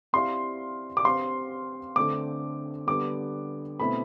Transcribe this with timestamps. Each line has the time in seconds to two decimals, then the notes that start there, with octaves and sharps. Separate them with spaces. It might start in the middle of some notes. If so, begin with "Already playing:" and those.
0.13 C4 E4 G4 D5 F5 C6
0.97 D6
1.04 C4 G4 C5 F5 C6
1.96 D3 A3 C4 D6
2.87 D3 G3 B3 D6
3.80 B2 A3 C4 E4 B4 B5